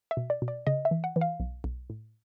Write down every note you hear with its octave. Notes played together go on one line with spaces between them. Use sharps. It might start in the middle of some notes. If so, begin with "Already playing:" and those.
E5
B2
D5
B2
D5
C#3 D#5
E5
E3
F#5
E3
F5
B1
B1
A2